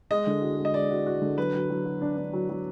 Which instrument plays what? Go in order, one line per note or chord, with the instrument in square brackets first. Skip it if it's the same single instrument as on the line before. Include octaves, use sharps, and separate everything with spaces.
[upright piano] G#3 [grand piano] D#5
[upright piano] D3
F#4
G#3
[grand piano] D#5
[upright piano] G#3 [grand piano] D5
[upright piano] F#4
F#4
D3
[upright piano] F#3 [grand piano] B4
[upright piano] F#3
F#3
F#4
D4
D4
F#3
F#3